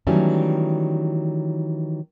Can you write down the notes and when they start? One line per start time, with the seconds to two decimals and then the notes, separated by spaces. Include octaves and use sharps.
0.07 D#3 E3 F#3 G3 A3 C#4